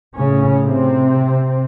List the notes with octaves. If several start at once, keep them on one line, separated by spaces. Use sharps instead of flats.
A2 C#3 C#4
C3 C4